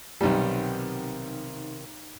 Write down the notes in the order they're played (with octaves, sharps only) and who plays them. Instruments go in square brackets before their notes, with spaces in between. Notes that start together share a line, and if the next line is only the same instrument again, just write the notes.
[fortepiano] B1 G3 [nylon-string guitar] C3 D#3 B3